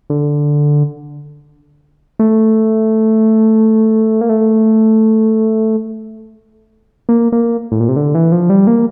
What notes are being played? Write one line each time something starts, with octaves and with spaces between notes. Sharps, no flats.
D3
A3
A#3
A3
A#3
A#3
A2
A#2
C3
D3
E3
F3
G3
A#3